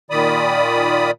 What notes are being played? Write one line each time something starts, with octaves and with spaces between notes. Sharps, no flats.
A#2 D#3 D5 B5 D#6